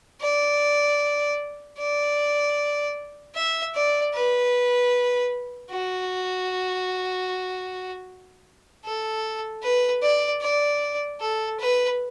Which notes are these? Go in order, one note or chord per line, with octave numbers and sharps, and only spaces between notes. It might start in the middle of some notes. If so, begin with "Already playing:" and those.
D5
D5
E5
D5
B4
F#4
A4
B4
D5
D5
A4
B4